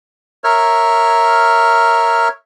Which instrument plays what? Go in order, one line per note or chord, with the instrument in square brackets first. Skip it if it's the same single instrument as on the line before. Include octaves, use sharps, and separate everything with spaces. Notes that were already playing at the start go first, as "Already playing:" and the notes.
[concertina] A#4 C#5 E5 F6